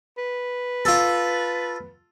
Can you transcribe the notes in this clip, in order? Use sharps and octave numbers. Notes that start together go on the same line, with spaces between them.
B4
F4 A4